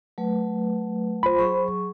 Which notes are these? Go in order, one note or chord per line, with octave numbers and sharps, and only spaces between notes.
F#3 A3 B4
F4 C5 B5
F#3 G#4 C#6